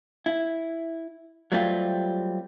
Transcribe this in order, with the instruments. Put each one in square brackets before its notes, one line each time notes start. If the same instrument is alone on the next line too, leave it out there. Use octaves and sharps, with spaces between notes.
[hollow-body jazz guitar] E4
F#3 G3 A3 C4 F4 G4